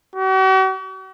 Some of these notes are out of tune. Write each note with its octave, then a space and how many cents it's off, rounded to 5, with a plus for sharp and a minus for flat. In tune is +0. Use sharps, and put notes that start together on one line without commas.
F#4 +45